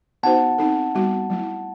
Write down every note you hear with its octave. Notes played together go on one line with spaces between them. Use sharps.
B3 D#4 F#4 C5 F#5 A5
C4 D#4 A4
G3 B3 F#4
F#3 A3 E4